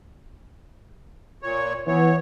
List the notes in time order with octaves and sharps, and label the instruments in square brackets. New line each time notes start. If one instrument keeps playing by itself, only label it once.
[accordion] A#2 C#5
[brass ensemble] E3 B3 [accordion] C#5